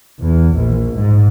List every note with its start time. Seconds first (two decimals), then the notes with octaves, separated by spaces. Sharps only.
0.21 E2
0.54 A#1
0.95 G#2